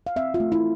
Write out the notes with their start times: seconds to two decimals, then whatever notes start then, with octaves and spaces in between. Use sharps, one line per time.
0.07 F5
0.16 C4 E5
0.34 F4
0.40 A3
0.52 E4